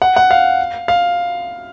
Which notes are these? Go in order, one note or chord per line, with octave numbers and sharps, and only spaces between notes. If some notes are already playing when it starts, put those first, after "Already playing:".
F#5
F#5
F5
F5